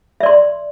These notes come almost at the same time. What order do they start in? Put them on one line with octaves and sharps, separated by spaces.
E5 D5 C6